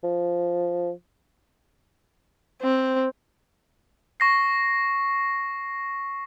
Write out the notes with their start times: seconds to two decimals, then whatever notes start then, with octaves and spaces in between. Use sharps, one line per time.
0.04 F3
2.62 C4
4.20 C#6 A#6 C7